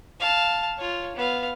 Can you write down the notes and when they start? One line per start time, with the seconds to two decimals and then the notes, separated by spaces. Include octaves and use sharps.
0.20 F5 A5
0.77 F4 C#5
1.16 B3 F5